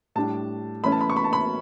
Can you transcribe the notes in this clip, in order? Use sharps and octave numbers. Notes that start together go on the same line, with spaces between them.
A2 G3 D4 A5
E3 A3 C#4 B5
A5
B5
C#6
B5
A5
B5